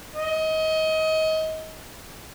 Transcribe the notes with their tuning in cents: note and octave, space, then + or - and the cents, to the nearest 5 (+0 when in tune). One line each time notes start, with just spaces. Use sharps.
D#5 +25